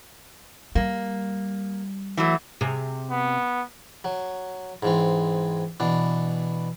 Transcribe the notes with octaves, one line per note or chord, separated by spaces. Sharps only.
G3 A#3
E3 F#3 A3
C3 G#4
B3
F#3
G#2 E3 C4
B2 E3 D4